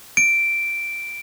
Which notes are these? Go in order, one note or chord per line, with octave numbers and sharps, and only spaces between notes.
D7